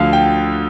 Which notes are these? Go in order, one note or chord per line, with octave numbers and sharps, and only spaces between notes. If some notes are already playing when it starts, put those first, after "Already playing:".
Already playing: D2 D3 F3 F5
G5